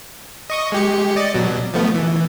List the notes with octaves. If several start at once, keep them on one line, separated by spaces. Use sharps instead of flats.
D#5 C#6 D#6
G#3 G4 C#7
D5 D#5 A6
B2 F#3
F3 A3 B3
E3